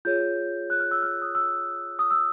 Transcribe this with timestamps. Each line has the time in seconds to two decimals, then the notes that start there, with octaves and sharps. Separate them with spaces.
0.05 F4 G#4 C#5 G6
0.70 F#6
0.80 F6
0.91 E6
1.02 F6
1.22 D#6
1.35 E6
1.99 D#6
2.11 E6